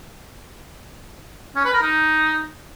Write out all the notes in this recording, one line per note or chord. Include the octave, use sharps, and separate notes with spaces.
C#4
B4
A#4
D#4